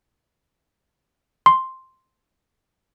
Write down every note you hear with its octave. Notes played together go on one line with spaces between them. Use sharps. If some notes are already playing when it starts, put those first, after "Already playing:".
C6